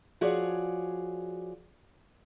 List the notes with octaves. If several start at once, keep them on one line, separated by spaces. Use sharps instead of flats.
F3 F#4 G#4 C#5 D5